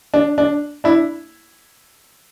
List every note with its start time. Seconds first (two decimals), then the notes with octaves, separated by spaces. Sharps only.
0.14 D4
0.38 D4
0.84 D4 E4